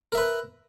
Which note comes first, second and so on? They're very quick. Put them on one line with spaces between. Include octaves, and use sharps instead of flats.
A#4 E5 B4